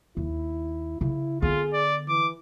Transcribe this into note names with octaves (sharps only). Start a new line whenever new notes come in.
D#2 E4
C#3 E4
D3 B3 F4 G#4
D5
E3 D6